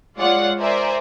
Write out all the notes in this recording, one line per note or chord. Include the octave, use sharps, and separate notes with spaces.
G#3 F4 C#5 D5 F#5
A#4 C5 D5 E5 G#5